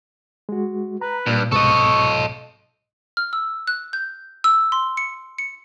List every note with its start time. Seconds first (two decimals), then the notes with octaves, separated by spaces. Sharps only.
0.49 G#3 F#4
1.01 B4 A#5
1.27 G2 A#2
1.52 C2 G#2 B2 A4 D#5 C#6
3.17 F6
3.33 E6
3.67 F#6
3.93 G6
4.44 E6
4.72 C6
4.97 C#7
5.38 C#7